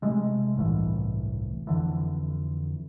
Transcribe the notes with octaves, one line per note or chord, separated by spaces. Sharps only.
C3 G#3 A3
G1 C2 A2 E3
F2 D3 E3